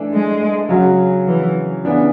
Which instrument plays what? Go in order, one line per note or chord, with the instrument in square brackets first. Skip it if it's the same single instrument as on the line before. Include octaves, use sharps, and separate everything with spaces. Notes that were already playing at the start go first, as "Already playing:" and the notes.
Already playing: [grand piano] E3 A3 D4
[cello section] G#3
[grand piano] C#3 F#3 C#4 F#4
[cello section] E3
[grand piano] C#3 E3 B3 D4